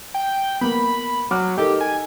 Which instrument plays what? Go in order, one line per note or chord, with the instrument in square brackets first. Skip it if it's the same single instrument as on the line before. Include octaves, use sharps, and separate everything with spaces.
[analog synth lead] G5
[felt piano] A#3 B3 [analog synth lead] B5
[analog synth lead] F#3 [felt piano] D6 F6
[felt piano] D#4 A4 A#4 [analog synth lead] G4
[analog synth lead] G#5